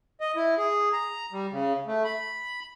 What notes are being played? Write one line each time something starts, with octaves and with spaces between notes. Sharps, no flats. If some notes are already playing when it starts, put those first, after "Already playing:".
D#5
E4
G#4
A#5
G3
C#3
A3
B5